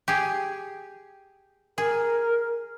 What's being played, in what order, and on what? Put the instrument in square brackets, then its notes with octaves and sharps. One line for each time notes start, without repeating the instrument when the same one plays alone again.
[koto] G4 G#4
[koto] G#4 [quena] A#4